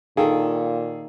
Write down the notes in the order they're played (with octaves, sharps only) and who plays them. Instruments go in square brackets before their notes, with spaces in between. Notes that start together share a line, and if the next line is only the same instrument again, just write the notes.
[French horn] A#2 [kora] D#3 [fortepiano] G#4 A4 [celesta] F5 G5